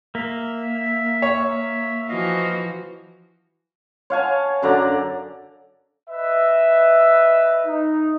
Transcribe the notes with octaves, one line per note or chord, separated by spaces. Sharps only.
A#3 E5
C#5
E3 F3 F#4 D#5 F5
C#5 F5 G#5 A5
F#2 D3 D5 A#5
B4 D#5 E5
D#4